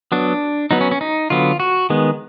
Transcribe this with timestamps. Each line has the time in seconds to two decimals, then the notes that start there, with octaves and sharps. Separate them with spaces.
0.12 F#3 B3 D4
0.71 F#3 B3 D#4
0.81 C#4
0.91 C#4
1.01 D#4
1.30 D3 F#3 B3 F4
1.60 F#4
1.90 D#3 G#3 B3